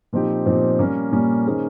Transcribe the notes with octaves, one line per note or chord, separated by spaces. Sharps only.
A#2 F3 C4 D#4 G4
A#2 F3 C4 D#4 G4
A#2 G3 A#3 C#4
A#2 G3 A#3 C#4
D#3 A#3 C#4 G#4 C5